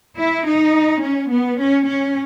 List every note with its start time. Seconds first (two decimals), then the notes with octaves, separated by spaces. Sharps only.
0.17 E4
0.46 D#4
1.02 C#4
1.30 B3
1.59 C#4
1.87 C#4